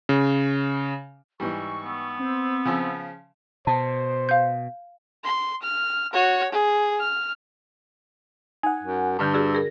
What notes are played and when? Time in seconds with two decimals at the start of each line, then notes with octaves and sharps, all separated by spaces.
0.09 C#3
1.40 G#2 E3 G3 C#6 E6
1.84 B3
2.20 C4 C5 E6
2.65 C#3 F3
3.67 B2 C5 A5
4.29 F5 G6
5.24 C6
5.62 F6
6.13 F#4 C#5
6.52 G#4
7.00 F6
8.63 D#4 F#5 G#5
8.83 F#2
9.19 G2 D3 D4 A5 F6 G6
9.34 F#4 G#4 D5 E6
9.55 G#4 A#4 A#6